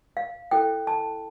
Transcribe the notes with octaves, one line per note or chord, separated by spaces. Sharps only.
F5
E4 A4 C5 G5
A5